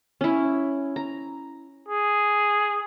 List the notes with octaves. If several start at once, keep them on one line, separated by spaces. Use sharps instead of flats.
C#4 E4
A#5
G#4